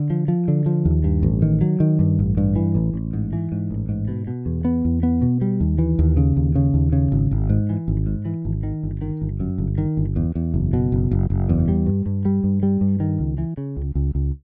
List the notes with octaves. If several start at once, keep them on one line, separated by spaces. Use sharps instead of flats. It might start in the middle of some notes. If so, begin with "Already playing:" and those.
Already playing: D3
F3
F3
D3
F3
D#2
G2
A1
D#3
F#3
D#3
G2
A1
G2
E3
A1
A1
G#2
E3
G#2
A1
G#2
B2
B2
E2
B3
E2
B3
B2
G3
D#2
E3
D#2
C#3
D#2
C#3
D#2
C#3
G#1
G#1
G#2
E3
G#1
G#2
E3
G#1
D#3
G1
D#3
G1
F#2
G1
D#3
G1
E2
E2
F#1
B2
F#1
F#1
F#1
E2
G3
G2
G2
G3
G2
G3
G2
D#3
C#2
E3
C#3
C#2
C#2
C#2